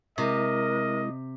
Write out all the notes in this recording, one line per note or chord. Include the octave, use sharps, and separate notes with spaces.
C3 G#3 E4 A#4 D#5